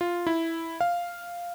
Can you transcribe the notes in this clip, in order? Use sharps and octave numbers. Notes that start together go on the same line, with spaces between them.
F4
E4
F5